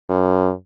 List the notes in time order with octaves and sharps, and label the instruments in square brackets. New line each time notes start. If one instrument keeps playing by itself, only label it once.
[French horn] F#2